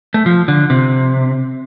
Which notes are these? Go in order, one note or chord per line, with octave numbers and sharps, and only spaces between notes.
A3
F3
D3
C3